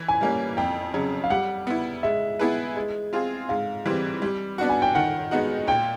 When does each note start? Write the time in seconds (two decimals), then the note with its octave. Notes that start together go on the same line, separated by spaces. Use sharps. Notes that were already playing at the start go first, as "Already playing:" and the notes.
Already playing: E3
0.08 G#5
0.21 G3 A#3 C#4
0.57 F2 G5
0.94 C#3 F#3
1.24 F5
1.30 G3 F#5
1.67 B3 E4
2.03 G#3 E5
2.39 B3 E4 G#4 B4
2.76 G#3
3.13 C4 F4 G#4
3.49 G#2 F5
3.86 E3 G3 C4
4.22 G3
4.58 B3 D4 F#4
4.69 G#5
4.82 G5
4.95 D#3 F#5
5.31 G#3 B3 D#4 F#4
5.67 A#2 G5